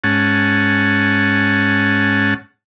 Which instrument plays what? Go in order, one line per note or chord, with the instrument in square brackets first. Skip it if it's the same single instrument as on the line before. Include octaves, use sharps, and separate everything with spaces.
[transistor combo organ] G#2 C#4 F#5 A5